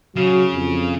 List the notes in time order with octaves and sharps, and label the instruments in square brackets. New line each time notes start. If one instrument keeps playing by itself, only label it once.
[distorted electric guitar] C#3 [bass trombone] F#3
[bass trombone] F2